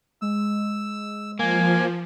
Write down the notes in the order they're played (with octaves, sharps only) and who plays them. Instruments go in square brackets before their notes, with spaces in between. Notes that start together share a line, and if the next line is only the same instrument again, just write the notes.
[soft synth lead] G#3 [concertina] E6
[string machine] F3 [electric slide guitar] A#3 [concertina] G#5